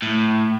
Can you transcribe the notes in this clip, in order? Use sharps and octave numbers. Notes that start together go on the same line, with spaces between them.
A2